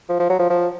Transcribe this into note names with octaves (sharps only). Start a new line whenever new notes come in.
F3
F3
F#3
F3
F3